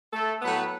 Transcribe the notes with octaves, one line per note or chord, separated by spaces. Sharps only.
A3 A4
A2 F#3 A3 B3 B4